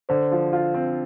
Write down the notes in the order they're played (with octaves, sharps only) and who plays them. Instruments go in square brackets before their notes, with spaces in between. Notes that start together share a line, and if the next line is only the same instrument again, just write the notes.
[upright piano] D3 [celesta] C5
[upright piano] F3
F4
C4